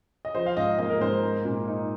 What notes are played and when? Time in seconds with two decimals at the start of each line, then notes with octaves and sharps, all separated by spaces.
0.25 D#5
0.34 F3 C5
0.46 F5
0.57 G#2 D#5
0.79 A#3 D#5
0.90 A#4
1.01 G#2 C5
1.24 A#3
1.45 A#2
1.67 D#4